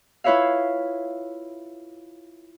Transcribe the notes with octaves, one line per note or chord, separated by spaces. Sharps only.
E4 F4 B4 C#5 E5 F5